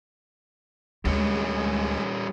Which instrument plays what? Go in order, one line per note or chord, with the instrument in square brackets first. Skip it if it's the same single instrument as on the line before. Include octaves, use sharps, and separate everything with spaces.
[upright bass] D2 [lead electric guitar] G3 C#4 [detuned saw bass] G#3